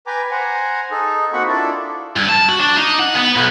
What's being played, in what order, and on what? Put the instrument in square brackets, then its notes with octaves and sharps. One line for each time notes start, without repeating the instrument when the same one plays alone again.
[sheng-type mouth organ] B4 G5 G#5 A#5 D6
C5 F#5 G#5 A#5
D#4 G#4 A4
A#3 C4 F#4 F#5 B5 C#6
D4 E4 F4 A4 D5
[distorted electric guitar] G2
A5
F#4
D4
D#4
F#5
B3
B1